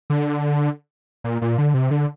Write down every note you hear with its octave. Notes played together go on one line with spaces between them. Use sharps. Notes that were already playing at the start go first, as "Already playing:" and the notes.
D3
A#2
A#2
D3
C3
D3